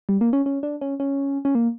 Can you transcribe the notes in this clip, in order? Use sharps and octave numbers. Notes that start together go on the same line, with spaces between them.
G3
A#3
C#4
C#4
D4
C#4
C#4
C#4
A#3